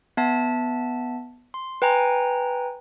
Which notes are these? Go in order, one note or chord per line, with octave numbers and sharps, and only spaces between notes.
B3 E5 A5
C6
B4 G5 G#5 A#5